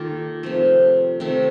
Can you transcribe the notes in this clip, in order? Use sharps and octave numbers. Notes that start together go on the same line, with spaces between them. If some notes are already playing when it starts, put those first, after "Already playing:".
Already playing: D#3 A#3 F4 G4 A4
C3 F3 A3
C3 D#3 A3